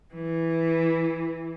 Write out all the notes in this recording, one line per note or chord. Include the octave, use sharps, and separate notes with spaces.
E3